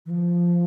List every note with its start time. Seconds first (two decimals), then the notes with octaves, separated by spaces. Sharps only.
0.06 E3
0.10 F3